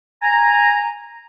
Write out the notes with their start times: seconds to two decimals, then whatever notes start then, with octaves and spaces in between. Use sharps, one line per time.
0.22 G#5 A#5